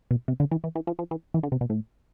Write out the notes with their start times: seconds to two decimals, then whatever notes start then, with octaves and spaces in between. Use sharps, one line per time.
0.11 B2
0.28 C3
0.40 D3
0.51 E3
0.64 E3
0.75 E3
0.87 F3
0.99 F3
1.11 E3
1.34 E3
1.43 D3
1.52 C3
1.61 B2
1.70 A2